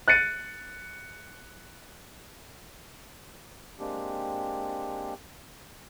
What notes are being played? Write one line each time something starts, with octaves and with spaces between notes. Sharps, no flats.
F#6 A6 C#7 D#7
G#3 A#3 C4 D4 G4